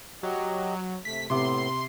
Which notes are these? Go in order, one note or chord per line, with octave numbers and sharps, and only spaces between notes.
F#3 G4 D#5
C3 A3 B6
A2 C3 B3 E5 C6 D6